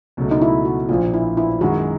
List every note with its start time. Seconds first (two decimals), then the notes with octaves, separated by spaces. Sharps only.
0.17 C#2 B2 F#3 A3
0.31 D#4
0.42 E4
0.65 F#4
0.89 A#1 A#2 F3 F4
1.14 E4
1.37 E4
1.61 F#2 D#3 G#3 F#4